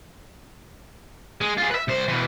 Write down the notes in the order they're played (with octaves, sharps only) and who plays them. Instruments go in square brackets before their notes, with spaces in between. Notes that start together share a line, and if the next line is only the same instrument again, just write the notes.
[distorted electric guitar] G#3
F4 G#4
B4 E5
C2 C5
B2 E3